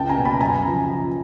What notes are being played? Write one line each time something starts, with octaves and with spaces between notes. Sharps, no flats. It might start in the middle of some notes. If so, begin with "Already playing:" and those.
Already playing: C#2 G5 A5
G#5 A#5
B2
A5 B5
F#2 G#5 A#5
C#3 F3